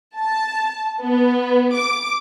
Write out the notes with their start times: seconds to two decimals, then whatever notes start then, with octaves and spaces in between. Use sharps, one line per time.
0.17 A5
1.01 B3
1.74 D6